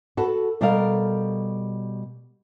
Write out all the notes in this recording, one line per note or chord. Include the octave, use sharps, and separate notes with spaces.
F#4 A4 B4
B2 G3 A4 A#4 F5